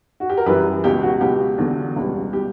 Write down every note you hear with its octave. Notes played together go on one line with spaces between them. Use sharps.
F#4
G4
A#4
F#2 E3 G3 G4 B4
C#2 B2 F#3 G4
F#4
C#2 B2 F#3 G4
E2 D3 F#3
C#2 B2 G3
B2 G3 G4